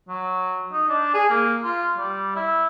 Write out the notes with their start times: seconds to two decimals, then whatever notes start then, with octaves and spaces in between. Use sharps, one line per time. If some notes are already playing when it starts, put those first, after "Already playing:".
0.09 F#3
0.73 D#4
0.89 D4
1.14 G#4
1.30 A#3
1.64 F4
1.97 G3
2.36 E4